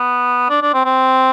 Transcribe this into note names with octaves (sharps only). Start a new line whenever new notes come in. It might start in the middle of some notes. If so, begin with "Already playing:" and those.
Already playing: B3
D4
D4
C4
C4